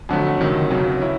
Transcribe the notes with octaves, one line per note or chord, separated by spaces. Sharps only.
F2 D3 F#3 A3
C#2 C3 D#3 F#3
G1 F#2 C#3 F#3
C#4 E4